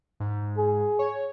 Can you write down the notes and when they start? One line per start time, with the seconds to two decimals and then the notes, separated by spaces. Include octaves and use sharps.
0.20 G#2
0.57 G#4
0.99 C#5